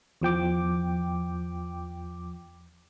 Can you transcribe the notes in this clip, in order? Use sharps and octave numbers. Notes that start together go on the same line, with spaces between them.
E2 F3 G5 D6